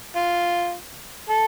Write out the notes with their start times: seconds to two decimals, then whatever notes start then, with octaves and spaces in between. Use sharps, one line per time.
0.16 F4
1.29 A4